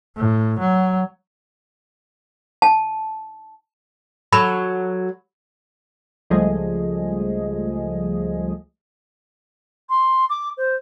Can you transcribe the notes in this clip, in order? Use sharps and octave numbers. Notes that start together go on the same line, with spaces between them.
A2
F#3
A5
F#3 F#4 A4 B5
C#2 F3 G3 A3 G#4 D#5
C6
D6
C5